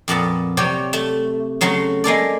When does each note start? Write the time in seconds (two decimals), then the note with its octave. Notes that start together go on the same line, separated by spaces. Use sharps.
0.08 F2 A#2 B3 A5
0.57 C3 F#3 C#5 D5 G5
0.93 A3
1.61 C#3 F#3 A3 C6
2.04 G#3 A#3 A4 D5